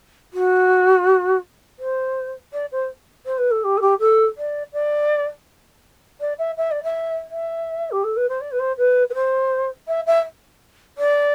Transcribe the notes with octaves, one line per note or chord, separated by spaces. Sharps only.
F#4
C5
D5
C5
C5
B4
A4
G4
A4
G4
A4
D5
D5
D5
E5
E5
D5
E5
E5
G4
A4
B4
C5
D5
B4
C5
B4
B4
C5
E5
E5
D5